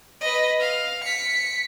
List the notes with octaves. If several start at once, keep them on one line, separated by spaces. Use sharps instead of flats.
B4 D#5
F5
B6 C#7